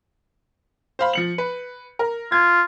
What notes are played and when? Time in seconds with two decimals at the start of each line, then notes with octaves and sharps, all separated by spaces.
0.99 C5 F5 B5
1.13 F3 C#7 F#7
1.38 B4
1.99 A#4
2.32 F4 G#6